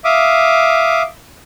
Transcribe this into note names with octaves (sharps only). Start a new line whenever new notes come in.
E5 F5 D6 D#6